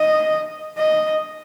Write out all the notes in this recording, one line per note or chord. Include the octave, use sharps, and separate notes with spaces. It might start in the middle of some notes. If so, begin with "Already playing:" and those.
Already playing: D#5
D#5